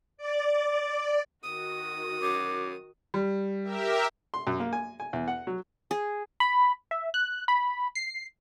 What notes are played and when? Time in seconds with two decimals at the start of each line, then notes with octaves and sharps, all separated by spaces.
0.17 D5
1.43 D#3 F#4 D#6
2.22 F#2 D6
3.14 G3
3.63 G4 A#4 E5
4.34 C6
4.47 F#2
4.60 A#3
4.73 G#5
5.00 G#5
5.13 E2
5.28 F#5
5.47 F#3
5.91 G#4
6.40 B5
6.91 E5
7.14 F#6
7.48 B5
7.95 C7